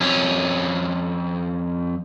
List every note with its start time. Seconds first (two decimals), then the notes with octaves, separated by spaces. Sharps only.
0.01 F2 C#4